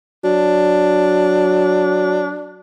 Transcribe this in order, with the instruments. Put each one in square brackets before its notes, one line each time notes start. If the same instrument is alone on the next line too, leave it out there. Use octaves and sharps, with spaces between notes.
[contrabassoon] F#3 [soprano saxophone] D4